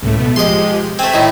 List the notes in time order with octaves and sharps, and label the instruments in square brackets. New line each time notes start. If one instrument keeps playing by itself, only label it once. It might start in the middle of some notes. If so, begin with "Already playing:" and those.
[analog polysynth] C#2 A2 A3
B2 A3 B3
[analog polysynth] F3 G#3 G4 [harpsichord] D#5 C6
[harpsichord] A3 C4 [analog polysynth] G#5 B6
[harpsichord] A2 D#3